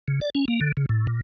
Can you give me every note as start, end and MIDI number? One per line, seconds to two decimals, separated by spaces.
0.08 0.20 49
0.21 0.30 74
0.35 0.45 61
0.48 0.60 58
0.61 0.72 50
0.77 0.86 49
0.89 1.07 45
1.07 1.21 46